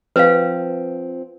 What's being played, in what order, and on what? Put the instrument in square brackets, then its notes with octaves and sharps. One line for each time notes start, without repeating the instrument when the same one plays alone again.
[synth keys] F3 C4 [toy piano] B4 F5